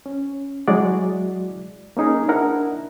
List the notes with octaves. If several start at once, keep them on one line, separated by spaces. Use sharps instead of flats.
C#4
F#3 G#3 E4 F#4 D5
A#3 C#4 D#4 G#4 A#4
D4 E4 A#4 F#5